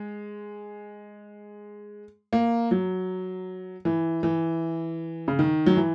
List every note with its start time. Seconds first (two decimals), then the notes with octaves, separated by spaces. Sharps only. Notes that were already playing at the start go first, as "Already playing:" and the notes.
Already playing: G#3
2.33 A#3
2.71 F#3
3.85 E3
4.23 E3
5.28 C#3
5.39 D#3
5.66 F#3
5.77 E3